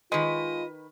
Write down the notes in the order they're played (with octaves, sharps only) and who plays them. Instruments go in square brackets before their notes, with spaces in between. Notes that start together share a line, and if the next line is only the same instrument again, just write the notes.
[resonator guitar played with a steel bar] D#3 B4 [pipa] G#3 [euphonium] F4 [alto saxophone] D#5